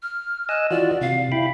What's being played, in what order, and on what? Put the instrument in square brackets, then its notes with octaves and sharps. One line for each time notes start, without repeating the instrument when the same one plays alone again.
[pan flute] F6
[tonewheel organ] D#5 G#5 E6 [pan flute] F#6
[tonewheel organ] E3 F4 F#4 [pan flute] D5
[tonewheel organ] C3 [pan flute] F5
[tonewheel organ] E4 G5 B5